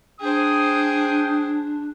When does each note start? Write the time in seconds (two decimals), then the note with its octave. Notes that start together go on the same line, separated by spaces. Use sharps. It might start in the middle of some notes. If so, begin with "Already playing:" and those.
0.21 D4 G#4 C5 G5 D#6